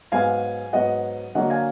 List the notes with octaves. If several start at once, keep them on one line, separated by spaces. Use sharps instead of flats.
G#2 F#3 B3 F5 G#5
G#2 F#3 B3 D#5 F#5
D3 F#3 A#3 D#5 F#5
F5 G#5